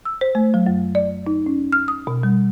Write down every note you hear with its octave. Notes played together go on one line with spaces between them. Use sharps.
E6
C5
A3
F#3
F#2
D5
D#4
C#4
F6
D#6
B2
G3